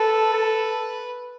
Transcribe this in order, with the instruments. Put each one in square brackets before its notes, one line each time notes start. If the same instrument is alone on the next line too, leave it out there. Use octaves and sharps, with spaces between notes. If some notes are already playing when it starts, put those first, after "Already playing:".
Already playing: [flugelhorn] A4 [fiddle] B4
[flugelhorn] A4